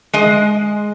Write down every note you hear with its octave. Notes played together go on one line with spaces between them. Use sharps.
G#3 D#5